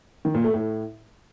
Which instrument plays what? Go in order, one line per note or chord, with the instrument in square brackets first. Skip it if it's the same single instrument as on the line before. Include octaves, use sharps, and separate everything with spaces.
[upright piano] D#3
A#2
A3
A2